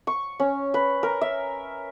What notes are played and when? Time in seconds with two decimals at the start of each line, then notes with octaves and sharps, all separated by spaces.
0.07 C#6
0.40 C#4
0.74 B4
1.03 A#4
1.21 E5